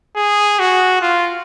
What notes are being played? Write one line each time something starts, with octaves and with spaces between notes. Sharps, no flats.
G#4
F#4
F4